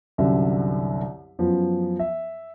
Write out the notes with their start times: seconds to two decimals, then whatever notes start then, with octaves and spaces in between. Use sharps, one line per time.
0.18 C2 F#2 D3 E5
1.39 F#2 F3 B3
1.99 E5